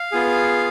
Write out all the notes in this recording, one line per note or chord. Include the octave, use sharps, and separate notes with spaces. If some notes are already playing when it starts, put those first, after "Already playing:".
Already playing: F5
B3 F4 G#4